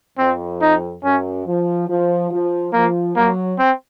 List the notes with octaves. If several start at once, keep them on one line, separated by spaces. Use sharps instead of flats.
F2 C4
D#4
F#2 C#4
F3
F3
F3
F3 A#3
F#3 A#3
C4